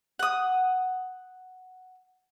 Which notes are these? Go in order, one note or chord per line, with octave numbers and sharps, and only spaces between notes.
F#5 D#6